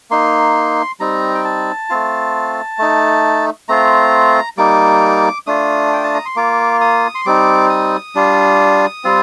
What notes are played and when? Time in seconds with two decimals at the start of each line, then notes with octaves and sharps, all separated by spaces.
0.11 A#3 D#4 C6
1.00 G3 C4 D#4 A#5
1.35 G5
1.44 A5
1.90 A3 C4 F4
2.79 A3 D#4
3.69 A3 C4 F4 A#5
4.57 G3 A#3 D#4 D6
5.47 A3 D4 F4 D#6
5.93 G5
6.04 A5
6.14 A#5
6.25 C6
6.36 A#3 F4 D6
6.81 D#6
7.15 C6
7.26 G3 C4 D#4 D6
7.70 D#6
8.15 G3 D4 F4
9.04 G3 C4 F4